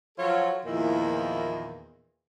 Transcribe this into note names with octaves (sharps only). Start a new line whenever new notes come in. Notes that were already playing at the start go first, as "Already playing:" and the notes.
F3 F#3 F4 A4 C#5
E2 A#2 D#3 F3 A#3 E4